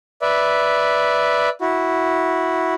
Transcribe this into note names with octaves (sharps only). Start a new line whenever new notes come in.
B4 D5 E5
E4 F#4